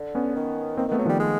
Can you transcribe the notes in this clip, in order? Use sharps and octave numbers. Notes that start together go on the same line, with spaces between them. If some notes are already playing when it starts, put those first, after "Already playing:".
Already playing: D3
B3 C#4
D#3
D#3 A#3 C4
D#3 A3 B3
F#3
D#3 F3 G3
G#3